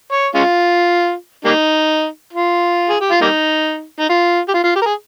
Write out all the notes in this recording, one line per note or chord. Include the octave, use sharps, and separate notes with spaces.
C#5
G#3 C#4 F4
G3 A#3 D#4
F4
G#4
G4
F4
G3 A#3 D#4
D#4
F4
G4
F4
F4
G4
A#4
G#4